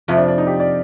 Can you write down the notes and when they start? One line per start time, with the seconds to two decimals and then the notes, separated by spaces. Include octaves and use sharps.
0.08 F2 C3 F3 F4
0.17 D4
0.28 D4
0.38 D#4
0.47 G4
0.60 D5